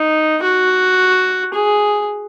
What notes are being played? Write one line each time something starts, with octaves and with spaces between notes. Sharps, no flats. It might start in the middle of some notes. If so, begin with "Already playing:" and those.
Already playing: D#4
F#4
G#4